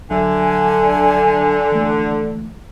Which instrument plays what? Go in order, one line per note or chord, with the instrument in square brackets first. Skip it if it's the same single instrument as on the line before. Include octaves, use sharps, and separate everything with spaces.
[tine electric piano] A1 F#3 E5 [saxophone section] D3 [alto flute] G#5
[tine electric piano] E3 A3